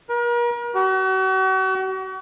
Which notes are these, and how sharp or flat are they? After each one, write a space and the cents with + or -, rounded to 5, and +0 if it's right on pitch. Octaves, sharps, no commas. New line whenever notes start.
A#4 +40
F#4 +40